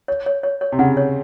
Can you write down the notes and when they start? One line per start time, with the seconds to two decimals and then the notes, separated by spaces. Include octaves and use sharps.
0.08 C#5
0.26 C#5
0.43 C#5
0.61 C#5
0.72 C3
0.79 C#3 F#5
0.97 C#5